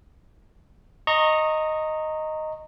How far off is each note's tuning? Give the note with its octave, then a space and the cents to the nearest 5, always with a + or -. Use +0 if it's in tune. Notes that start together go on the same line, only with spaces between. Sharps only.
D#5 +0 A#5 -15 C#6 -20